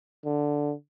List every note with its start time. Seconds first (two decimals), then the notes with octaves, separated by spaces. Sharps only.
0.25 D3